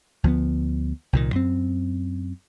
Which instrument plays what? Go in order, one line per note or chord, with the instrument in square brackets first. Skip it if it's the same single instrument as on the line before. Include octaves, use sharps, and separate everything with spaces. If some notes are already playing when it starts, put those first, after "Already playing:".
[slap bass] D2 F3 F#3 B3
C2 A#2 D#3
F#2 C4